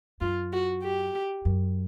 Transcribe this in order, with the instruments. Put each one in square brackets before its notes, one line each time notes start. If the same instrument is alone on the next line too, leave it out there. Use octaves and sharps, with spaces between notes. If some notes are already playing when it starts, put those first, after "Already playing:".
[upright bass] F#2 [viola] F4
[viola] F#4
G4
[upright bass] F#2